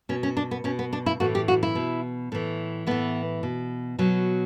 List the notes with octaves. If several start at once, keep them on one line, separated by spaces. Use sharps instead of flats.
B2 C#4
C#4
D4
B3
B2 C#4
B3
D4
E4
A2 E3 F#4
G4
F#4
E4
B2
A2 E3
A2 E3 B3
B2
B2 F#3